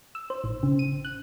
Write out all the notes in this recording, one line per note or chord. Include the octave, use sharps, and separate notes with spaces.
E6
C5
A1
C#3
D#7
F#6